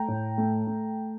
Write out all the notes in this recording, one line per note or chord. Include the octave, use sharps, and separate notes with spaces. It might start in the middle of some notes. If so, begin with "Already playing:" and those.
Already playing: A3 G5 A#5
A2
A3
A3